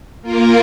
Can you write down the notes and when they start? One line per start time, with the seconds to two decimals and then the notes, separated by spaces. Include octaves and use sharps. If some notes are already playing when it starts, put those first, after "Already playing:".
0.22 A#3 F4 A#4